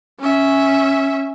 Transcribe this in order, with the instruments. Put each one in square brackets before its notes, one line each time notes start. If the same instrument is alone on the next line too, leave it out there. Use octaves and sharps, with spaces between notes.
[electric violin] C#4 E5